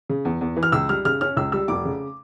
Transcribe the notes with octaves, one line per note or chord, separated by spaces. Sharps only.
C#3
E2
E2
E3
F6
C#2 E6
G3 F6
C#3 F6
C#4 F6
C#2 E6
G3 E6
F1 D6
C#3